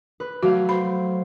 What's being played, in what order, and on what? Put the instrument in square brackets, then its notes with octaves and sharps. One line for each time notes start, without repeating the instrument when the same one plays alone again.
[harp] B4
[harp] F#3 A3 F5 [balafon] F#4
[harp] C5 [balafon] B5